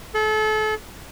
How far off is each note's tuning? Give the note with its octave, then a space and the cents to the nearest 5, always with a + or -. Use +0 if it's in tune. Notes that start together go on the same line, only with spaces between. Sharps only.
A4 -35